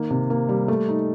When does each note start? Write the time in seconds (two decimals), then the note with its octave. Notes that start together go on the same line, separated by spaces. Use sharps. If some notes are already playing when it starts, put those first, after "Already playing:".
Already playing: D#3 A#3
0.10 C3
0.30 A#3
0.49 G3
0.68 A3
0.88 D#4